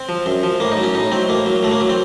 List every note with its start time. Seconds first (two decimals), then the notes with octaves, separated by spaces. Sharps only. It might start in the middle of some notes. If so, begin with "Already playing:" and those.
Already playing: C4
0.09 F3
0.26 F#2
0.43 F3
0.60 A2 A#3
0.72 D#4
0.77 F#3
0.83 C#4
0.95 A2 D#4
1.12 F#3 C4
1.29 A2 A#3
1.46 F#3
1.63 A2 A3
1.71 A#3
1.81 F#3
1.89 C4